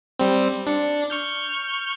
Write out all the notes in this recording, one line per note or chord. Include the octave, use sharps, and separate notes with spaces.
G3 C4
D4 C#7
C#6 F6 G6